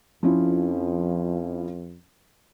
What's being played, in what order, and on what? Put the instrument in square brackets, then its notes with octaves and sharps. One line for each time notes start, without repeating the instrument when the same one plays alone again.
[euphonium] F2 [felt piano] F3 C#4 E4